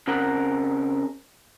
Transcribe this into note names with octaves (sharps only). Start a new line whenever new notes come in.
C#3 C4 A#4 F#5